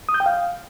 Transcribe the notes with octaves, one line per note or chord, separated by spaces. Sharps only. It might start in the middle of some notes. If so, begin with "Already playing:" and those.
D#6
G6
G5
F5